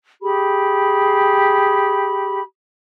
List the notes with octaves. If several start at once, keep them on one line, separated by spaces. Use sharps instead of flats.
G4 G#4 B5